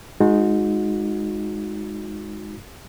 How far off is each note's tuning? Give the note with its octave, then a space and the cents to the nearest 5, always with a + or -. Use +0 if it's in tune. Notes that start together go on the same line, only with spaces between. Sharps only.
G#3 +0 D#4 +0 F#4 -35